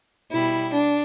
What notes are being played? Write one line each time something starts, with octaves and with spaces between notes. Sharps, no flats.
B2 G3 E4
D4